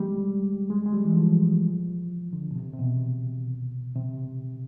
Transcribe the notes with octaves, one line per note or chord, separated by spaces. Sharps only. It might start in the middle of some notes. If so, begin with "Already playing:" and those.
Already playing: G3 G#3
G#3
G#3
G3
E3
F3
D3
B2
C3
C3
B2
C3